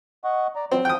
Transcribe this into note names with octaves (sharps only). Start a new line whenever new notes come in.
D#5 F#5 C#6
D5 A#5
F#3 C4
F3 G5 D#6